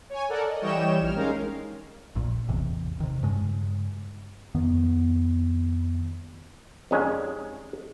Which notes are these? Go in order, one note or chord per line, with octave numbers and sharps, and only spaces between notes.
C#5 G#5
A4 A#4 D5 F#5
D#5
E3 G3 C#5 D#5 G5 E7
A#1 F6
G#3 C#4 D#4 A#4 F5
A#1 A#2
A1 E2 C3
C3 D#3
G2 C#3 G#3
F2 D#3 B3
F2 C3 D#3 G#3 C#4 D4